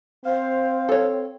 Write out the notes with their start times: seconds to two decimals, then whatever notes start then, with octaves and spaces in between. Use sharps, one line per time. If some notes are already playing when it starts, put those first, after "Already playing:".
0.25 C4 C5 F5
0.89 A4 C#5